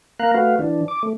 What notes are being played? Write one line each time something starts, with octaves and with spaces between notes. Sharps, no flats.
A#3 F5 A#5 F#6
A3 F#4 B4 F5
E3 D4
D6
A3